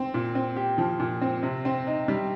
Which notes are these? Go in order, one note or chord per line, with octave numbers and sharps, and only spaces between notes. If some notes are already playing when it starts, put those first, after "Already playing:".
Already playing: C4
A#2
C4
G4
F3
A#2
C4
C3
C4
D#4
G3